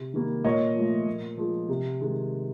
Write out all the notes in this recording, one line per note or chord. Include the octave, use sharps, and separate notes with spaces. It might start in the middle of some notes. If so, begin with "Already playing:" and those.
Already playing: C3
D#3 G3 A#3
A#2 C#5 D#5
F3 A3
A#2
F3 G#3
C3
D#3 G#3